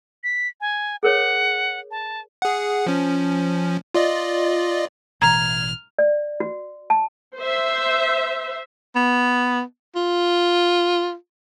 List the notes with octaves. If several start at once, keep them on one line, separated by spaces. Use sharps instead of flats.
B6
G#5
G#4 A#4 C#5 F#5
A5
G#4 F#5
F3 C#4
F4 D5 D#5
A1 B2 E3 A#5 F6 G#6
D5
F#4
A5
C5 E5
B3
F4